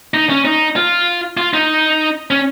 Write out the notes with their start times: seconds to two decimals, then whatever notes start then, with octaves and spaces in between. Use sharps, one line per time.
0.14 D#4
0.29 C#4
0.45 D#4
0.76 F4
1.37 F4
1.54 D#4
2.31 C#4